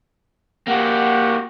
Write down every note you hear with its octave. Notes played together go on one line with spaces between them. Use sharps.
A#3 F#4 G4 F#5